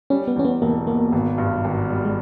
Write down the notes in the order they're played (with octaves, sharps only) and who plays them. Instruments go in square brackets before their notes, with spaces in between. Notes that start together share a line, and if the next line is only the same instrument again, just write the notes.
[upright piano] G3 [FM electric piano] C#4
[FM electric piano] B3
[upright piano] E2 [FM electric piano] C#4
[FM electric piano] B3
[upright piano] E1 [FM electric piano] A#3
[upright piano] B2 [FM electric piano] A#3
[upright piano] G#1
G2
G#1
G3
[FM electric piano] G#3